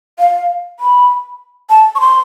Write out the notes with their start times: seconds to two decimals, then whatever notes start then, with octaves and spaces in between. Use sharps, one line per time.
0.19 F5
0.80 B5
1.70 A5
1.95 C#6
2.00 C6